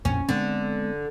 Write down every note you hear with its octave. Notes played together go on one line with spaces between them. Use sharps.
A#1 F2 A2 C#4
D3 G#3 B3 C4